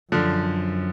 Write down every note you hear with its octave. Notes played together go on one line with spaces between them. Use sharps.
F#2 D3 F3